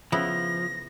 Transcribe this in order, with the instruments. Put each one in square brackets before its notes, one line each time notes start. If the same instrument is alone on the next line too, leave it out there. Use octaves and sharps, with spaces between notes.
[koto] C#3 B3 E4 [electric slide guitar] F3 [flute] A#6